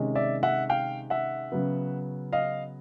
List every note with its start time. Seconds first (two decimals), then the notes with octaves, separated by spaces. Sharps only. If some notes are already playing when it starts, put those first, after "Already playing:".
Already playing: C3 D#3 G#3 C#4
0.15 D5 E5
0.43 E5 F#5
0.69 F5 G5
1.10 E5 F#5
1.52 C#3 F#3 B3
2.33 D#5 F5